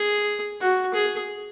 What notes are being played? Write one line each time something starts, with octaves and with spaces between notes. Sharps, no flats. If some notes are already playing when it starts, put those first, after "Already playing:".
Already playing: G#4
F#4
G#4